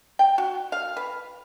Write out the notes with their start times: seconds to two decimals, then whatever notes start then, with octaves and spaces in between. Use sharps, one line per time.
0.19 G5
0.38 F#4
0.72 F5
0.97 B4